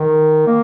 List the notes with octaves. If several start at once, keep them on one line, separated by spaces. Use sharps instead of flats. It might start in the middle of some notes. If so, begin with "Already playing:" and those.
Already playing: D#3
A#3